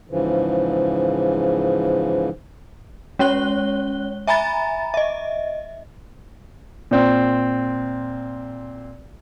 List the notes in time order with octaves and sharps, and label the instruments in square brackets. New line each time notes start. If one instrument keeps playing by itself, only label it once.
[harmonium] G#2 C#3 E3 F3
[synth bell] G#3 C#4 C#5 F#6 G7
E5 G#5 A#5 B5 A6
D#5 E5
[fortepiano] A#2 C4